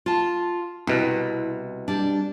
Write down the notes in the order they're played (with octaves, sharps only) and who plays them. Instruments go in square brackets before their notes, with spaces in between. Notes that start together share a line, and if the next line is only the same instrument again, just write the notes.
[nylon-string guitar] F4 A5
[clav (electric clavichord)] C2 B2 [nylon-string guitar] E4
[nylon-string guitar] G3 D4